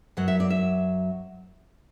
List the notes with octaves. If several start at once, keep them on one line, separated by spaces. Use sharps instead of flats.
F#2 F#3 F#5
E5
D5
E5